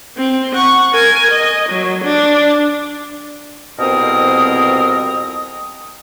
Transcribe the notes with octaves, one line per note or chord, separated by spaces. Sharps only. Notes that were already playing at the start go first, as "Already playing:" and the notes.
C4
F#5 C#6
A#4 G#5
D#5
F#3
D4
C2 F2 B2 C4 A#4 D#6